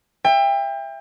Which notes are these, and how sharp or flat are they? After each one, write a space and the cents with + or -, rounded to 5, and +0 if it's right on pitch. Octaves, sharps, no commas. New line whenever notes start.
E5 +15 G5 +30